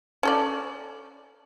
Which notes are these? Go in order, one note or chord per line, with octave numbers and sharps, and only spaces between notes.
C#4 A4 D5